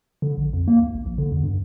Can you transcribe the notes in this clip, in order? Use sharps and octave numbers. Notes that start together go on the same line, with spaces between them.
D3
A#1
F2
A#3
D#2
G#1
A#1
D3
E2
G2